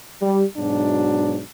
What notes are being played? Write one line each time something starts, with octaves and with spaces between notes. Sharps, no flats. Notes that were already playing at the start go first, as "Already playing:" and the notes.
G3
G#2 B2 F#3 D4